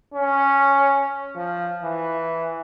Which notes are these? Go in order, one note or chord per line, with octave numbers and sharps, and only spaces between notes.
C#4
F3
E3